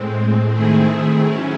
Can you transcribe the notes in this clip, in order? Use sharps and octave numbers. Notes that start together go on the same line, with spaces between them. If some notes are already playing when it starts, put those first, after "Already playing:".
Already playing: A2 G#3 C4
D#3 A3 C4 E4 G#4
F#3 C#4 E4